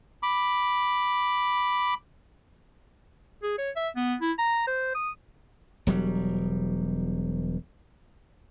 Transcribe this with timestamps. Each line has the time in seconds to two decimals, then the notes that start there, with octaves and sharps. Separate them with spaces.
0.23 B5 D6
3.43 G#4
3.58 C#5
3.76 E5
3.96 B3
4.21 E4
4.39 A#5
4.67 C5
4.95 D#6
5.87 E1 F#3 G3